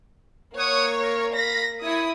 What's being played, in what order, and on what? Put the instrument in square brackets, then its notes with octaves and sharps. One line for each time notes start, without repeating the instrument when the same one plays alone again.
[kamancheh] A#3 [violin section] C#5 [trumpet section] F#5 D#6
[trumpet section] A#4
[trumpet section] F5 B5 [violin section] A#6
[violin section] E4 D#6 [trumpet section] C#5 G#5